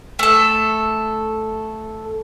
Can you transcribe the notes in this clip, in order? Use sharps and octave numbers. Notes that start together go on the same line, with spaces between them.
A3 A4